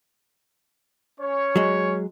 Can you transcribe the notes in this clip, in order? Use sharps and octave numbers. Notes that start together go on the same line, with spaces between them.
C#4 C#5
F#3 G#3